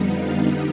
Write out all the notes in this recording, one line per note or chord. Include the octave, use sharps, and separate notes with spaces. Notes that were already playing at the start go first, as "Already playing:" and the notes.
Already playing: F2 D3 G3 B3 D#4
F5